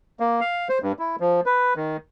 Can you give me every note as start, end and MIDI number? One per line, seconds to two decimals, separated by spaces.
0.20 0.40 58
0.41 0.68 77
0.69 0.78 72
0.82 0.92 43
0.99 1.16 64
1.20 1.41 53
1.46 1.73 71
1.76 1.97 51